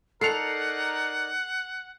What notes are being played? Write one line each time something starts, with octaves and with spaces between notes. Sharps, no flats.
D#4 A4 A#4 D5 F#5 C7 C#7 F7